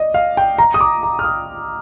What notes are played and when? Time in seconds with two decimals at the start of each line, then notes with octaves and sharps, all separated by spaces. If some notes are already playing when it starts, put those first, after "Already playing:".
Already playing: D5 D#5
0.14 F5
0.37 G5
0.58 A#5
0.74 D#6
0.81 D6
1.03 A#5
1.19 F6
1.24 D#6